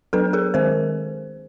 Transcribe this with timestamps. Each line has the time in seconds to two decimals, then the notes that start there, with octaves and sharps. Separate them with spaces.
0.13 F#3 B3 D4 A4 B4
0.33 G#4 A#4
0.54 D#3 G#3 C4 A#4 C5